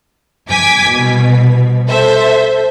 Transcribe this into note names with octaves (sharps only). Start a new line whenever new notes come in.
G#5 D6 G#6 B6
C2 B2
A4 C5 E5